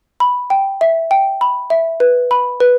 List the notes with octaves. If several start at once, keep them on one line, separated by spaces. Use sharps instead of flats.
B5
G5
E5
G5
B5
E5
B4
B5
B4